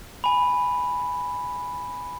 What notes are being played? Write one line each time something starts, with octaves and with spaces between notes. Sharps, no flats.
G#5 B5